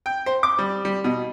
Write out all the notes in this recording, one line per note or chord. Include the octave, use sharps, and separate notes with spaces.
G5
C5
D6
G3
G3
B2